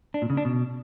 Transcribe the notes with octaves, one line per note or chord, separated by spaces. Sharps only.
D4
A#2
C#3
D4
B2